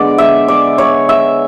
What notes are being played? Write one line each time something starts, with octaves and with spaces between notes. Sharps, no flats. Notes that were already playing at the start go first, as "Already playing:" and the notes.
Already playing: D3 G#3 B3 D5
E5
D5
C#5
E5